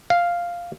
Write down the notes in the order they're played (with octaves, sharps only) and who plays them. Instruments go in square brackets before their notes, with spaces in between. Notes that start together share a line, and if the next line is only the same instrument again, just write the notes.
[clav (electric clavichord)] F5